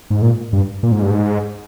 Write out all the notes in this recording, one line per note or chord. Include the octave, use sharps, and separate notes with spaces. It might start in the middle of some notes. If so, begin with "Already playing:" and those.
G#2
A#2
G2
A#2
G#2
G2
G#2